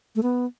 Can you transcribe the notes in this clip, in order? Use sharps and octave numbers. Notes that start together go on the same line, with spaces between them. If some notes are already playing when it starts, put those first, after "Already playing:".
A3
B3